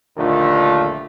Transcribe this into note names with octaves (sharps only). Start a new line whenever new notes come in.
A#1 D#2 D3 A3 F4